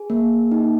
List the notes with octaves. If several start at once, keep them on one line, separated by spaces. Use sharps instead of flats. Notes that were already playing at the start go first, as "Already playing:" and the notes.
Already playing: G#4
A#3
D#4